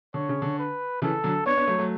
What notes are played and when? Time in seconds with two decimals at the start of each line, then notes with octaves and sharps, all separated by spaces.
0.14 D3 C#5
0.29 C#3
0.42 D3
0.59 B4
1.02 C#3 E3 A4
1.24 D3 F#3
1.46 B3 D4 C#5
1.57 B3 D4
1.68 F#3 A3
1.78 F#3 A3